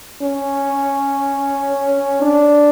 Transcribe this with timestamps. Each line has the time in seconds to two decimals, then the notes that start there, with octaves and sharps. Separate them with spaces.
0.22 C#4
2.22 D4